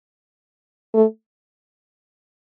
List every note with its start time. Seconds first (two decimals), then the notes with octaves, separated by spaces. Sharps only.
0.94 A3